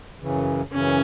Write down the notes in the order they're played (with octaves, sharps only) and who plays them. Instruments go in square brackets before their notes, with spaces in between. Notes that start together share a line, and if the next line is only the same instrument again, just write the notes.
[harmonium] F#2 C#3 E3
[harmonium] F#2 C#3 E3 [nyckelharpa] C#4